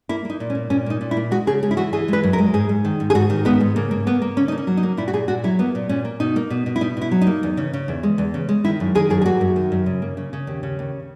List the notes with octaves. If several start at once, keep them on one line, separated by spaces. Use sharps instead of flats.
A#3 E4
A#3 D#4
A#2
C#4
A#3
A#2 C#4
A#3 D#4
A#2
E4
A#3
G#3 F#4
C#3 G#4
G#3 G#4
E4
E3 F#4
E3 G#4
G#3 B4
F#2
A#4
G#3
G#2 G#4
G#2
D#3
G#2
G#4
G#2 F#4
D#3
G#3 B3
G#2
C#3 A#3
A#3
A#3 B3
A#3
C#3 C#4
D#4
A#3
C#4
F#3
D#4
A#3
A#2 E4
F#4
A#2 G#4
A#2 F#4
F#3 E4
A#3 B3
A#2
A#2 C#4
A#3
B2 D#4
A#3
B2
B2
E4
B2 D#4
B2 E4
F#3
D#4
A#3
E2
C#3
C#3
E2
G#3
E2
C#3
G#3
D#3 E4
F#2
D#3 G#4
F#2 G#4
G#4
A#3 F#4
F#2
D#3
F#2
C#3
A#3
C#3
C#3
D#2
C#3
D#2